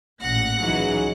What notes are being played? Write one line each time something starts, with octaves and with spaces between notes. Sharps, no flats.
A1 A#2 F#5 A#6
C#2 E3 F#3 D#4 G#4